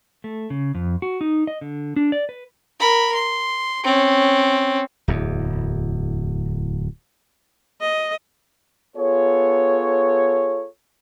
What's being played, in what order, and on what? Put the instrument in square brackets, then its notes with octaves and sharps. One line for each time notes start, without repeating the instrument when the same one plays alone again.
[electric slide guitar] A3
C#3
F2
F#4
D#4
D#5
D3
D4
D5
B4
[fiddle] A#4 B5
C6
C4 C#4
[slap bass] D1 E2
[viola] D#5
[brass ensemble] B3 F4 G#4 A4 C#5